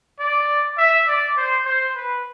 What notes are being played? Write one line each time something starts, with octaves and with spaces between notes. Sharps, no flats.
D5
E5
D5
C5
C5
B4